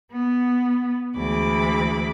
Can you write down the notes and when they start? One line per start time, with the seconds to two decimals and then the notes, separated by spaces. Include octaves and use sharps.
0.12 B3
1.15 D2 E3 G#3 B5 D6